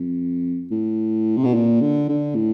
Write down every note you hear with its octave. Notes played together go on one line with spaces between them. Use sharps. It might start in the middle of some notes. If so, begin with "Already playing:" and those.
Already playing: F2
A2
C3
B2
A#2
D3
D3
A2